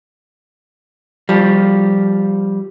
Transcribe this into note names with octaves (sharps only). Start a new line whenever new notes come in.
F3 G3